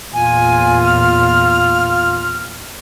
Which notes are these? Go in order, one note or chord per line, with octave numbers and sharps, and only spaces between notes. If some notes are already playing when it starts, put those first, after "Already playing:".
E2 A#2 F4 G#5
F6